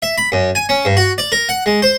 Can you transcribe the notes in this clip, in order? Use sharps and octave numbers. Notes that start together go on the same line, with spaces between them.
E5
B5
F#2
G#5
C#4
G2
F#4
D5
A#4
F#5
G#3
C5